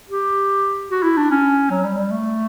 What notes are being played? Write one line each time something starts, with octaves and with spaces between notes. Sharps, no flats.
G4
F#4
E4
D4
C#4
F#3
G3
G3
A3